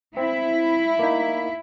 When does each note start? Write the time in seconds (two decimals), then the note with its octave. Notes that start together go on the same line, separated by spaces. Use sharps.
0.17 C4 E4
0.99 A#3 D#4